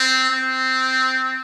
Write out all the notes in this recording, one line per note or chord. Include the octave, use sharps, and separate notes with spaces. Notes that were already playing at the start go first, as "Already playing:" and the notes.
Already playing: C4
C4